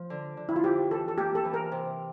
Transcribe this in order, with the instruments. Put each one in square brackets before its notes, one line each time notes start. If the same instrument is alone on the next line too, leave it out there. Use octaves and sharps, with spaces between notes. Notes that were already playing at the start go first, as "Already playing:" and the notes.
Already playing: [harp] F3
D3
D3
[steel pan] E4
F4
[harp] F2 [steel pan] G4
[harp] E3 [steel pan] A4
[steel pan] A4
[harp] A#3 [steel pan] G4
[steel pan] A4
[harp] E3
[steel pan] A#4
[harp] C3